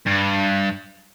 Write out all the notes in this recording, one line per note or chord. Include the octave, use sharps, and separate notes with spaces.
G2